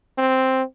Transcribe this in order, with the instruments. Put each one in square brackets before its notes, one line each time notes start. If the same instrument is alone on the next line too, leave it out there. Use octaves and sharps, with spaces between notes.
[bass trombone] C4